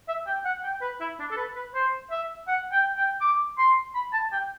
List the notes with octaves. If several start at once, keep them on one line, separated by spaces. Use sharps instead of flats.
E5
G5
F#5
G5
B4
E4
D4
A4
B4
B4
C5
E5
F#5
G5
G5
D6
C6
B5
A5
G5